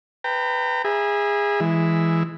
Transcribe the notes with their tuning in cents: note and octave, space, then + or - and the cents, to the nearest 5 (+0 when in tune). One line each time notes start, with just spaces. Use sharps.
B4 +10 G5 +0 A#5 -35
G#4 -20 E5 +0 B5 -45
E3 +0 G#3 +0 E5 +0